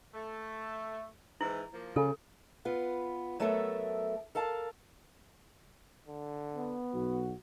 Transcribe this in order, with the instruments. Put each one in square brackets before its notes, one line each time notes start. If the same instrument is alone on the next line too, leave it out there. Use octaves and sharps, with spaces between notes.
[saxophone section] A3
[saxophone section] G#2 E3 [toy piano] E4
[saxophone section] F3 A#3
[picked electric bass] C#3 [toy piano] A4
[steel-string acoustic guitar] B3 F4 B4
F#3 A3 B3 A4 A#4 E5
A4 A#4 F5 A5
[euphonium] D3
[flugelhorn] B3
[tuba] B1 [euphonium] F#4